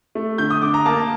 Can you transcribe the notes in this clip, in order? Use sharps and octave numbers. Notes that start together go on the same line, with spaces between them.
A3
D3 G6
D#6
D3 D6
A#5
A#3 A5